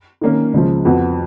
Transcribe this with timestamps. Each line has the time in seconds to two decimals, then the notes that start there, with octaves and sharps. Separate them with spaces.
0.21 D#3 A#3 C#4
0.54 C#2 C#3 F3
0.85 F2 F3 B3 F#4